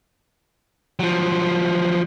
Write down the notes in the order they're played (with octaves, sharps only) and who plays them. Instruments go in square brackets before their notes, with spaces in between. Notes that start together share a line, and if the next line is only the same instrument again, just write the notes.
[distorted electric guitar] F3 F#3